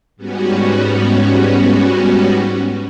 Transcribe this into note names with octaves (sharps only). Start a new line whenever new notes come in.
G#2 G3 B3 C#4 F#4